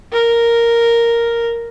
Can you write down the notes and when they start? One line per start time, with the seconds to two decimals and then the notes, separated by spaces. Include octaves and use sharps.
0.12 A#4